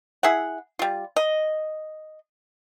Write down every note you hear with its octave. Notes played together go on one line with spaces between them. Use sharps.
E4 G#4 E5 F#5
G3 F4
D#5